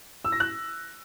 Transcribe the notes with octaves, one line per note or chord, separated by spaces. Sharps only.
E6
A#6
F#6